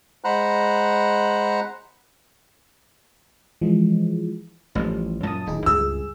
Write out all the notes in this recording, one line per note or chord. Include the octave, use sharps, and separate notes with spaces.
G#3 C5 F#5 A#5 B5 F#6
E3 F3 G#3
A1 A2 F3 G3
F#2 A#2 F#3 A5 D#6
D1 D#3 D#4 G#4
C#2 G2 G#4 E6